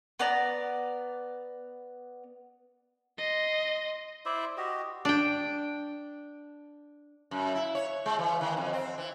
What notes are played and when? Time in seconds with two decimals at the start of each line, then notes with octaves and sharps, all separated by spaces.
0.19 B3 D5 A#5
3.18 D#5 C6
4.25 E4 C5 D5 E5
4.57 F#4 G4 D#5
5.05 D4 G5
7.31 F#2
7.55 E4
7.75 C#5
8.06 G#3
8.19 E3
8.41 D#3
8.57 F2
8.73 C4
8.98 E3